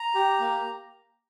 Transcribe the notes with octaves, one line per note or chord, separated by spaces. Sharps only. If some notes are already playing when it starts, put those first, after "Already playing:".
Already playing: A#5
G4
A#3